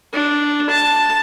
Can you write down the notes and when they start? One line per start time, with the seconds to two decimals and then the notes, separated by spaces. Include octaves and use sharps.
0.13 D4
0.69 A5